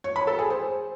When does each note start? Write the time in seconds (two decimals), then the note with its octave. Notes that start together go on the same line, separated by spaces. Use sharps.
0.04 C#5
0.16 B5
0.27 A4
0.39 G#4
0.50 C5